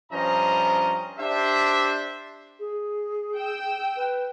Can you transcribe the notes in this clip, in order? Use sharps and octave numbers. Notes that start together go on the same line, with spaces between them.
G2 F3 C#4 C5 D#5 A#5
D4 G4 C5 E5
G#4
G5 E6
B4